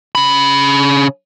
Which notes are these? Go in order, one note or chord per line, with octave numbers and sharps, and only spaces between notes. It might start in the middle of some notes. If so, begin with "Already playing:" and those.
C#3 B5